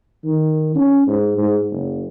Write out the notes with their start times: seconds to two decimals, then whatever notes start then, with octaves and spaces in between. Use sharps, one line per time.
0.24 D#3
0.75 C#4
1.07 G#2
1.37 G#2
1.71 F#1